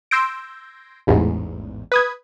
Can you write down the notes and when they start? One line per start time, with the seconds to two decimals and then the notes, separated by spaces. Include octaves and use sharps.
0.11 C6 E6 G6 G#6 A#6 D7
1.07 A1 E2 G#2
1.92 B4 D#6 G#6